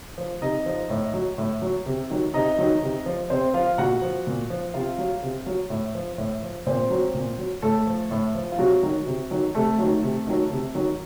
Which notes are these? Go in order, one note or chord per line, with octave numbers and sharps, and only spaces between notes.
F3
C3 D#4 D#5
F3
A2
F#3
A2
F#3
C3
D#3 F#3
C3 D#4 D#5
D#3 F#3
C3
F3
C3 C4 C5
F3 F4 F5
A#2 F#4 F#5
F3
A#2
F3
C3 F4 F5
F#3
C3
F#3
A2
F3
A2
F3
A#2 C4 C5
F#3
A#2
F#3
A2 A3 A4
F3
A2
F3
F4
C3 F#3 F#4
D#3 F#3
C3
D#3 F#3
C3 A3 A4
D#3 F#3
C3
D#3 F#3
C3
D#3 F#3